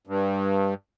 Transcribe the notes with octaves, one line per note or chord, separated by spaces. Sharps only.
G2